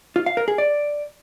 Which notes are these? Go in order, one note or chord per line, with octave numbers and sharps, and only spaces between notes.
F4
F5
A#4
G#4
D5